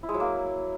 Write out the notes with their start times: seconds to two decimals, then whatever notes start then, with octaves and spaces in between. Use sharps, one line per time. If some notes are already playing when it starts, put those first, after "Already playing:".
0.03 E4
0.09 G#3
0.14 F#3
0.20 A#3